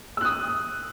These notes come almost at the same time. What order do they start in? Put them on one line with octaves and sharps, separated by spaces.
E6 F#6 D#6